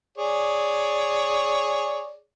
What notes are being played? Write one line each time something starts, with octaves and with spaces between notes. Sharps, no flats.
G#4 C#5 D5